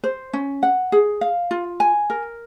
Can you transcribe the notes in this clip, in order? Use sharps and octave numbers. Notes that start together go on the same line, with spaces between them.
C5
C#4
F#5
G#4
F5
F4
G#5
A#4